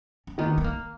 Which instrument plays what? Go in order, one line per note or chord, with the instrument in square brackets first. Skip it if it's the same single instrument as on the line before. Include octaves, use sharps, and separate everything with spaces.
[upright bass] C#4
[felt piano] D#3 A#3 D#4 [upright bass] B3
[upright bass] B3
A#3